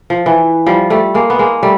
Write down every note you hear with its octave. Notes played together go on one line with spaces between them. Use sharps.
F3
E3
F3 G3
G3 A3
G#3 A#3
B3
G#3 A#3
G3 A3